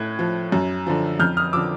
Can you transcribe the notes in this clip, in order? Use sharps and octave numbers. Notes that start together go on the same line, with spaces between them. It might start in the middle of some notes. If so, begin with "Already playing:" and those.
Already playing: A2 F#6 G#6
F3
F#2
D3 F3
F2 F6 G6
D#6 F6
D3 F3 D6 E6